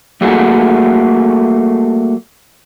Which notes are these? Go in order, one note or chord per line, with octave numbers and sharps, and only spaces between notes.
G3 A3 A#3 F#4 G#4 A4